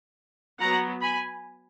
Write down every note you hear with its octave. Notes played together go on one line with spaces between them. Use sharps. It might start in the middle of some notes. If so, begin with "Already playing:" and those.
F#3 B3 F#5 A#5
G#5 B5